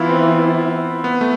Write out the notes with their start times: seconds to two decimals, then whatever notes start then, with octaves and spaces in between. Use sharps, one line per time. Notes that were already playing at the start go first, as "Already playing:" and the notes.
Already playing: E3 B3 E4 F4
0.09 C4
1.04 B3
1.21 A3